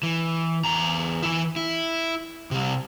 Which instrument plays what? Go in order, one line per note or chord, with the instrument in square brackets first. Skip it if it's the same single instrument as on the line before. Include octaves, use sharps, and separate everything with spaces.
[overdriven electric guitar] E3
E2 A#5
E3 E4
E4
C3 G3